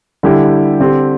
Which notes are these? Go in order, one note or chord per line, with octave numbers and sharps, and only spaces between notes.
D3 G3 E4 G4
D3 C4 G4